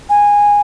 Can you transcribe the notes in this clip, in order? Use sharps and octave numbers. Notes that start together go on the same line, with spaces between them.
G#5